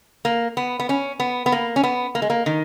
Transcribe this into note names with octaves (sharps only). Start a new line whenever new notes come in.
A#3
B3
B3
C#4
B3
B3
A#3
C#4
B3
A#3
G#3
A#3
D#3